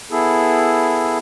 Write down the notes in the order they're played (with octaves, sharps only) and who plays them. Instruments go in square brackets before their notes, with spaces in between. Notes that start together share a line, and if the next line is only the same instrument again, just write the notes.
[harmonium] B3 E4 G#4 A4